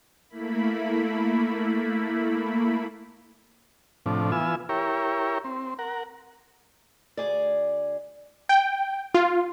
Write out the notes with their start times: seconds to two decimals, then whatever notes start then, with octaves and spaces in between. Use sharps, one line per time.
0.29 A3 A#3 E4 B5
4.06 A2 C3 F3 D4
4.32 E3 B3 F4 G#5 E6
4.69 E4 G4 A#4 C#5
5.44 C4
5.79 A#4 F#5
7.17 D2 G#4 D5
8.49 G5
9.14 F4